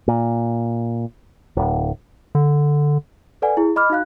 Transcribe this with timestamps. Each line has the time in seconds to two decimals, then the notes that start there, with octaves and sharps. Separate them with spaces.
0.08 A#2
1.57 D1
2.35 D3
3.42 A4 B4 D5 F#5 G#5
3.57 E4 G#4
3.76 D#5 B5 D6 F6
3.90 D#4 F#4 F5 F#6